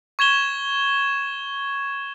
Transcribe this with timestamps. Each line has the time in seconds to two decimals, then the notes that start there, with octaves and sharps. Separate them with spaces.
0.19 C#6 G#6 E7 G7